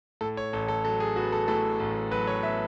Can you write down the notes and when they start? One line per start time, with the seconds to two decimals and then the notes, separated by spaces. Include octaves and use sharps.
0.21 A2 A4
0.37 C#5
0.53 A1 A4
0.68 A4
0.85 F#3 A4
1.00 G#4
1.16 B3 F#4
1.32 A4
1.48 A2 A4
1.80 A1
2.11 F#3 B4
2.27 C#5
2.43 B3 E5